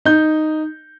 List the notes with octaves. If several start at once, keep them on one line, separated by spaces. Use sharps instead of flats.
D#4 G6